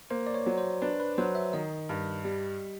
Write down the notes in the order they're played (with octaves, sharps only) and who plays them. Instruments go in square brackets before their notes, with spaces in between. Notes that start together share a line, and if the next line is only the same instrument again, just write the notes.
[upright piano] A#3 [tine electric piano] C5
[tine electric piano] D5
C#5
[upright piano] F#3
[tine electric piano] C5
[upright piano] D4 [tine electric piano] B4
[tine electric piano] B4
[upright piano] F#3 [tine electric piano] C5
[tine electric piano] E5
[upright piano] D#3 [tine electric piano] D#5
[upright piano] G2
G3